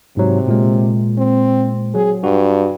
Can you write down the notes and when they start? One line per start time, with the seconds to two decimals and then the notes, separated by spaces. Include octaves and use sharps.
0.17 G#2 C3 F#3
0.48 A#2 G#3
1.18 C4
1.95 F#3 G#4
2.24 G2 F#4